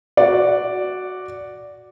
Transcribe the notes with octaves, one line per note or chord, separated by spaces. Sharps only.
F#4 D5